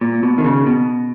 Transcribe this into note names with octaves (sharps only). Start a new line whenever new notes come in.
A#2
B2
D#3
C#3
B2